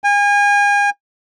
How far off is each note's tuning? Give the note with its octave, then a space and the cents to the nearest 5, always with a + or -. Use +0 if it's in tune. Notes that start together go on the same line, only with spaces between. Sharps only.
G#5 -35